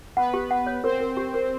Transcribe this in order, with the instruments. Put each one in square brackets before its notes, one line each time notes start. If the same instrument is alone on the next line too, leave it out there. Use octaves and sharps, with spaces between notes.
[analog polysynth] B3 B4 [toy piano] F#5
[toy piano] G4
F#5
C#5
[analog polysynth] C4 C5 [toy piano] A#4
[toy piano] A#4
G4
A#4